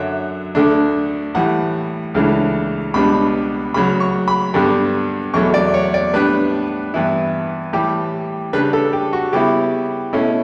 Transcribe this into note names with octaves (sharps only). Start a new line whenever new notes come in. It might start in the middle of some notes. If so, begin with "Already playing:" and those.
Already playing: F#2 D3 F#3 E5
D2 D3 A3 D4
A2 E3 G3 F#5
C#2 C#3 E3 A3 D4
C#2 B2 G3 B3 D4 B5
D2 C#3 F#3 B5
C#6
B5
G2 D3 G3 B3 D4
E2 B2 F#3 A3 C#6
D5
C#5
D5
A2 G3 B3 D4 B4
G2 E3 B3 E4
A2 E3 G3 G4
C#3 G3 D4 B4
A4
G4
F#4
C#3 G3 B3 E4 G4
B2 A3 C#4 E4